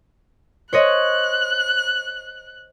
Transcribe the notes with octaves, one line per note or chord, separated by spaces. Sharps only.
C5 C#5 D#5 F#6